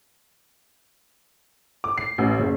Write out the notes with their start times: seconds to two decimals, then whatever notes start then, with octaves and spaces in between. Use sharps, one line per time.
1.84 D6
1.98 C7
2.18 A1
2.39 F#1